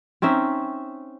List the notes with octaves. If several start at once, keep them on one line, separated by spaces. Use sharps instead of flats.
C4 C#4 D#4 E5